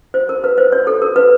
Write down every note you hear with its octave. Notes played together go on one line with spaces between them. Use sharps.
C5
A#4
B4
C5
C#5
A4
A#4
B4